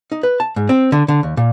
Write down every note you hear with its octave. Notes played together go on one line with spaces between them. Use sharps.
D#4
B4
A5
G#2
C4
D3
D3
D#2
A#2